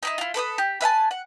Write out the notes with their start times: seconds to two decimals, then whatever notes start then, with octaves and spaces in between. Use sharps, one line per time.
0.03 D#4 E4 D#5
0.18 E4 F4
0.34 A4 B4 D6 D#6
0.58 G4
0.81 B4 E5 G#5 A5
1.11 F#5